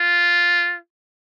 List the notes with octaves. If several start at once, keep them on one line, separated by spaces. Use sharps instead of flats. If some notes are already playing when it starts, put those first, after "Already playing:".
Already playing: F4